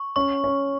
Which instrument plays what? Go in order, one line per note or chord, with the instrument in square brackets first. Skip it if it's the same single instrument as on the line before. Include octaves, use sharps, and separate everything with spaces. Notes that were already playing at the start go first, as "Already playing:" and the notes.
Already playing: [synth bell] C#6
[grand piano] C#4 [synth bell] C#6
[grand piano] C#4